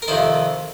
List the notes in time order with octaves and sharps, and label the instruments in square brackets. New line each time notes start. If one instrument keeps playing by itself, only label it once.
[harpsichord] A#4
F2 C3 D#3 C5